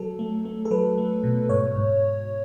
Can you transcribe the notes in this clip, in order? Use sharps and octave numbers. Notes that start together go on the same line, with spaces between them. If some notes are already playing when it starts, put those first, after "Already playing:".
Already playing: F#3 A4
A3
A3
A4
F#3 B4
A3
B2
G#2 C#5
G#2